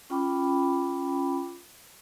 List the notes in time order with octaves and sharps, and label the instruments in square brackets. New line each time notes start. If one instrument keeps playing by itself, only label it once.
[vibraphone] C#4 F4 G5 B5 D6